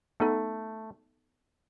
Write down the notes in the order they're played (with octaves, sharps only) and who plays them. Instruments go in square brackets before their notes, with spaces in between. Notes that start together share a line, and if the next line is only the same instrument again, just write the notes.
[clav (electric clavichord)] A3 [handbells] B3 D#4 A4